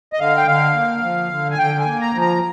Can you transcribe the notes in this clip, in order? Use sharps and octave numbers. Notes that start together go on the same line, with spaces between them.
D#5
D3 F5
G5
D3 F5
A#3
F3
D3
G#5
D3 G5
G#5
A#3
A#5
F3
A#5